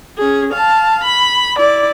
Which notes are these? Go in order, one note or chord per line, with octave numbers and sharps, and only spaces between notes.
C#4 G#4
F5 A5
B5
E4 D5